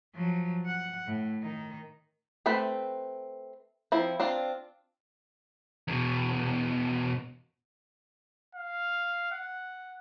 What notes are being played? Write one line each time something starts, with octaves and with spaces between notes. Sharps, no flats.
F3 F#3
F#5
A2
D#3 D#4
A3 C4 B4 B5
F3 C4 E4
C4 D4 F4
E2 B2
F5
F#5